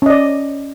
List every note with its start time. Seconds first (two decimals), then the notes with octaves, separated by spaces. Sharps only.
0.02 C#4
0.06 D#5
0.10 D5